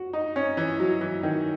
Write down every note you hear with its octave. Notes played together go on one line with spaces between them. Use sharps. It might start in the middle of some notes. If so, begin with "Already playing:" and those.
Already playing: F#4
D#4
C#4
E3
F#3
E3
D#3